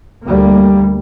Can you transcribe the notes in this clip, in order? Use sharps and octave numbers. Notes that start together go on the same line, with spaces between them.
D2 G3 A#3